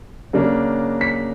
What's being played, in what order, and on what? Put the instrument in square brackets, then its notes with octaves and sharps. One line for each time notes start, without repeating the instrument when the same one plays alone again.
[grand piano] C#3 F#3 A#3 D4
B6